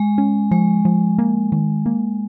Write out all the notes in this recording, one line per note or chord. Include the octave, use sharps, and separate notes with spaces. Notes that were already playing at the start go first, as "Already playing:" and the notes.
Already playing: G#3
C#4
F3 G#3
F3
A#3
D#3
A#3